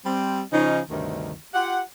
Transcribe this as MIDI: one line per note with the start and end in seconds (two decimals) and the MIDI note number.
0.04 0.40 55
0.04 0.40 60
0.52 0.79 49
0.52 0.79 53
0.52 0.79 61
0.52 0.79 63
0.89 1.32 38
0.89 1.32 43
0.89 1.32 48
0.89 1.32 51
1.54 1.80 65
1.54 1.80 67
1.54 1.80 78